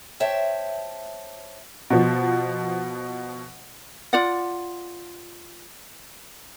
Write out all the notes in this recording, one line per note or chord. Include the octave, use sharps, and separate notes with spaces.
C5 C#5 E5 G5 A5
B2 F3
F4 D5 F#5